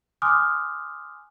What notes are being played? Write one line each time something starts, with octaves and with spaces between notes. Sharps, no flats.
G#5 C6 D6 D#6 F6 F#6